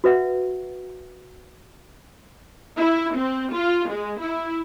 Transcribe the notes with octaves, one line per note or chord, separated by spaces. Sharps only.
F#4 B4 E5 F#5
E4
C4
F4
G#3
E4